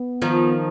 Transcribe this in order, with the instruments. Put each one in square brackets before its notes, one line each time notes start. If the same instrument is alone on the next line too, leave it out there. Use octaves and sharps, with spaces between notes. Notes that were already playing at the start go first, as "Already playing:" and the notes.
Already playing: [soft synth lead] B3
[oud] D#3 F3